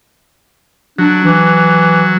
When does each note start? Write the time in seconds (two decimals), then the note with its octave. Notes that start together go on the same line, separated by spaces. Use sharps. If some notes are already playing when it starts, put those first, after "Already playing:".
0.99 F#3 D4
1.24 E3